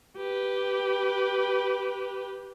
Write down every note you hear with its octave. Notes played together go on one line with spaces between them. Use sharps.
G4 B4